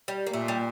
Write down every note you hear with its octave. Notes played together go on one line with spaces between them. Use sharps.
G3
A#3
A#2 A3
G3